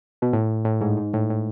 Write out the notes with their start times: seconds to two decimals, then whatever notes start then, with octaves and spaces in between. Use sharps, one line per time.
0.22 B2
0.33 A2
0.65 A2
0.81 G#2
0.97 G#2
1.14 A2
1.30 A2